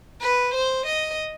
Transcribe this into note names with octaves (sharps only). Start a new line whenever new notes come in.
B4
C5
D#5